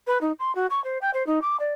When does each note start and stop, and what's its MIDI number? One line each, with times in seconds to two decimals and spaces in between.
0.07 0.18 71
0.21 0.32 63
0.39 0.54 84
0.55 0.66 66
0.70 0.82 85
0.84 0.98 72
1.01 1.10 79
1.14 1.25 72
1.27 1.39 63
1.42 1.57 86
1.60 1.74 74